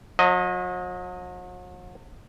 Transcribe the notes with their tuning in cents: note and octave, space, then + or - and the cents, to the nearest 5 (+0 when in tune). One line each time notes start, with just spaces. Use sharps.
F#3 -45 D#5 +0